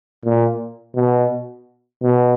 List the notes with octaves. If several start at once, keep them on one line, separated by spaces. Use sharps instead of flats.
A#2
B2
B2